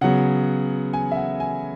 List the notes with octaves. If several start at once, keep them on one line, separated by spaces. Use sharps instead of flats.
C#3 F#3 B3 F#5
G#5
E5
F#5
G#5